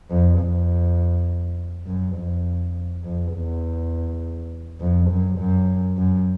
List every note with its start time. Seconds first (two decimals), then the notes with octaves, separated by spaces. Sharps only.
0.10 F2
0.40 F2
1.87 F#2
2.16 F2
3.04 F2
3.33 E2
4.81 F2
5.10 F#2
5.39 F#2
5.98 F#2